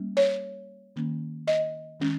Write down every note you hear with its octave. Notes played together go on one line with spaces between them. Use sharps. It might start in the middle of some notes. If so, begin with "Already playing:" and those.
Already playing: G3 A#3 C#4
C#5
D#3 A#3 C#4
D#5
D#3 G#3 C#4